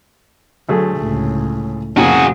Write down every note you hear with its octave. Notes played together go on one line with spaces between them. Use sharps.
D2 F#3 A3 G#4
C#2 A2
F1 F2 A#2 C#3 F#4 G#4